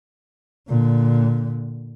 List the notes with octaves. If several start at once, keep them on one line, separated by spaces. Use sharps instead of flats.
A#2 D3